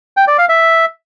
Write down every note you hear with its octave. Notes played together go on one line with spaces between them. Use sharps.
G5
D5
F5
E5